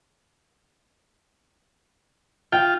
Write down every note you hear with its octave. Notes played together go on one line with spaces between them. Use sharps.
F4 G5